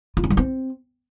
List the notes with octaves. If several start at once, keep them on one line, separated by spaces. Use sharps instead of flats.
F4
C#4
G3
C4